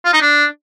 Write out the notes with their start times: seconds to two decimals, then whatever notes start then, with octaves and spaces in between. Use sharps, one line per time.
0.05 F4
0.13 D#4
0.22 D4